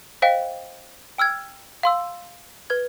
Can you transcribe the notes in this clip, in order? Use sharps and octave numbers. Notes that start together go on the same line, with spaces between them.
C5 D#5 F5 G5 B6
G5 E6 F6 G#6
F5 C6 E6
B4 G#6